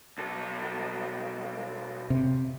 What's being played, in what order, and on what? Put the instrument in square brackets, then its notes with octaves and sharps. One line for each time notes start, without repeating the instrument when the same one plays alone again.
[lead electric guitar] B1 A4
[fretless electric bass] C3